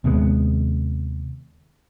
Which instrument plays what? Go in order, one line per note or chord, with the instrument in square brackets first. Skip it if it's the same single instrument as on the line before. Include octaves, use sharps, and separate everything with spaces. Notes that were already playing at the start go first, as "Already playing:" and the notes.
[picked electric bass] D#2 C3 G#3 B3